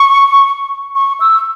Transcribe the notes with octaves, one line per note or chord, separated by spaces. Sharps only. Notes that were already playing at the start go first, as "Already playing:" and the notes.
Already playing: C#6
C#6
E6